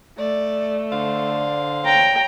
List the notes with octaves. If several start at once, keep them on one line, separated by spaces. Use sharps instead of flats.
A3 D5
D3 C5 D5 F5
C#5 G5 A#5